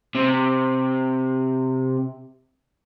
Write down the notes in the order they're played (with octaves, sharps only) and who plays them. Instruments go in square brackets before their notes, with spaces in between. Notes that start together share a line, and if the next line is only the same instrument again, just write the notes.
[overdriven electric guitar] C3